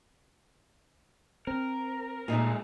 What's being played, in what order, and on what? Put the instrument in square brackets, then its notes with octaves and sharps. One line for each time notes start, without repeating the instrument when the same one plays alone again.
[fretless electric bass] C4 [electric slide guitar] A#4
[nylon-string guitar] A#2 D#4 [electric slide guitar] G#3 A3 F4